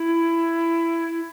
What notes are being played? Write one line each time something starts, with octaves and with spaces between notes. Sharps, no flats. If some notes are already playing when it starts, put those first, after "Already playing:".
Already playing: E4